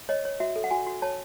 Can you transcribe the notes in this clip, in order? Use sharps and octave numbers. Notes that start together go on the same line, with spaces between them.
C#5 D#5
C#5
F#4 E5
A4
F#5
F#4 G#5
F#4
C#5 A5